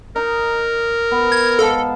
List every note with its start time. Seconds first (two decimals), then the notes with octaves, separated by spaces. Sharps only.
0.16 D#4 A#4
1.11 B3
1.32 G#6
1.59 G#2 A4 F5 A5